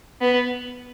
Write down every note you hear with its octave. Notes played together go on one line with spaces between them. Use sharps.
B3